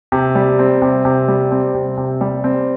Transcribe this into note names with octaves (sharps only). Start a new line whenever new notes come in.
C3
G3
C4
C3
C3
G3
C4
C3
C3
G3
C4